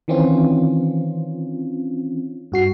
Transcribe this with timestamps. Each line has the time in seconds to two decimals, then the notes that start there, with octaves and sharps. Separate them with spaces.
0.08 D#3 E3 C4 C#4 F4
2.52 G2 F#4 C7